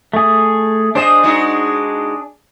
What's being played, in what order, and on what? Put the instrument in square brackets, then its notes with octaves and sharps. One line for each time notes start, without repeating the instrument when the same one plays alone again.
[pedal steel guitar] A3 G#4
[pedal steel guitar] D4 G#4 [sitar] C5 D#5
[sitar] G#3 D#4 F#4